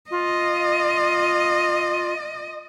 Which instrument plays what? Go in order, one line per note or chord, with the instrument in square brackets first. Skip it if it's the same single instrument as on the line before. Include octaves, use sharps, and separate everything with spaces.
[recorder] F4 [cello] D#5